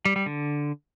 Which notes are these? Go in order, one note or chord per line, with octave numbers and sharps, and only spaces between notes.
G3
G3
D3